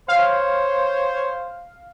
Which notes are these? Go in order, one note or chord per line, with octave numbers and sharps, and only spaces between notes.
C5 C#5 F5